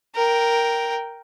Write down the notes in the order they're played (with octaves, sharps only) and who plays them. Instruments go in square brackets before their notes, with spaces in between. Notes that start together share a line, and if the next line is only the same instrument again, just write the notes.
[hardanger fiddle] A#4 G5